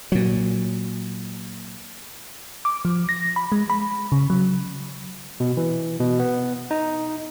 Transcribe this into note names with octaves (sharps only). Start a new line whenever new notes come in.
A#2 F#3
D6
F3
A#6
B5
G#3
B5
C#3
F#3
B2
E3
B2
B3
D#4